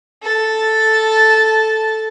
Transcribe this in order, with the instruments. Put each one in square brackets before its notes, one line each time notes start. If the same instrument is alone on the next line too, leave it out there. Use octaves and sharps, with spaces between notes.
[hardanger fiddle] A4 A5